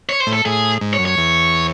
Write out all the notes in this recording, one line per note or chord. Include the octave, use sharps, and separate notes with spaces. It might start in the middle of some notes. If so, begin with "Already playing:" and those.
C#5
C5
A2
A4
A2 G#4
G#2
C#5
F#2
C#5
E2